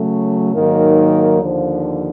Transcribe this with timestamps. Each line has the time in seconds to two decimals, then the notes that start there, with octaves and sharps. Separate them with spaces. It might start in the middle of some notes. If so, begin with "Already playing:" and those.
Already playing: C#3 F#3 A3
0.54 G#2 D#3 F#3 A#3
1.38 D#2 D3 F3